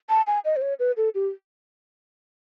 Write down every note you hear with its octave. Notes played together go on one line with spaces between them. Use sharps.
A5
G#5
D#5
C5
C#5
B4
A4
G4